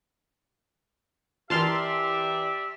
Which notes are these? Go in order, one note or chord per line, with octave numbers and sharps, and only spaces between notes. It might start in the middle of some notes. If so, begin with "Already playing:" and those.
E3 G4 A#4 D5 E5 A5 C6 F6